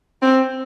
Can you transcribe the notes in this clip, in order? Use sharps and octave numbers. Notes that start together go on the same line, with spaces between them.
C4